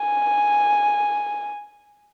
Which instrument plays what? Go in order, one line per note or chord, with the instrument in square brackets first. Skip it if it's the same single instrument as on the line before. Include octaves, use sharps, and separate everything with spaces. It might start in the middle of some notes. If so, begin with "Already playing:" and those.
Already playing: [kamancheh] G#5